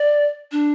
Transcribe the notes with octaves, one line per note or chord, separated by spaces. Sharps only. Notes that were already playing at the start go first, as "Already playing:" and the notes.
Already playing: D5
D4